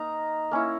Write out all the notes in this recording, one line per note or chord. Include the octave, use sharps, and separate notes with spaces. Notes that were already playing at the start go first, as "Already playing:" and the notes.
Already playing: A#3 D#4 A#5
A#3 C#4 E4